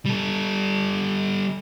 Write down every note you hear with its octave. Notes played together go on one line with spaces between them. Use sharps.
G3 A4